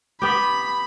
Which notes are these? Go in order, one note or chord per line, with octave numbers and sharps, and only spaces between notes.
B3 G4 B5